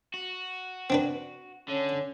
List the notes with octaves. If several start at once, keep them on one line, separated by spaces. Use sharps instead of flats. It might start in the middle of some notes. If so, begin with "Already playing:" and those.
F#4
C4 D4 B4
D3 C#4